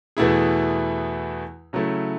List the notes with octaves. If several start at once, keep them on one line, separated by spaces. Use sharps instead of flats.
E2 B2 A3 E4 G#4
C#3 F#3 A3 E4